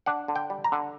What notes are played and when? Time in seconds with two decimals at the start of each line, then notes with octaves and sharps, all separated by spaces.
0.06 D4 F#5
0.28 D3
0.36 G5
0.50 G3
0.64 A#5
0.72 D3